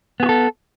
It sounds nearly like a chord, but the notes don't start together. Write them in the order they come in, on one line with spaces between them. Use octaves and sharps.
B3 G#4 F#4 A4